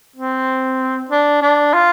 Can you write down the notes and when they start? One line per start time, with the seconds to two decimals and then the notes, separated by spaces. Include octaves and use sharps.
0.16 C4
1.10 D4
1.42 D4
1.74 F4